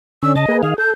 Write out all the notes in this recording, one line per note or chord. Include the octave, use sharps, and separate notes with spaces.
D3 C#4 E6
C#3 D#5 A5
A#3 G#4 B4
D#3 G#4 F5
A4 G6